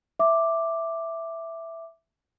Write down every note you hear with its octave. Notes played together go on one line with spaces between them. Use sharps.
E5 D6